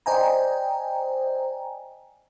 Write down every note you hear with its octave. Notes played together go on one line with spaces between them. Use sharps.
C5 D5 D#5 G5 G#5 A#5